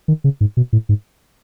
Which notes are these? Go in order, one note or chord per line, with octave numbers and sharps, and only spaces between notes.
D#3
C#3
G#2
B2
A2
G#2